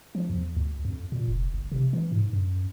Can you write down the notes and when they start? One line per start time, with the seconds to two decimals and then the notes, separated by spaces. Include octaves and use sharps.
0.15 F3
0.30 E2
0.57 D2
0.85 F2
1.12 A#2
1.28 F1
1.54 G1
1.72 C3
1.93 E3
2.12 G#2
2.33 F#2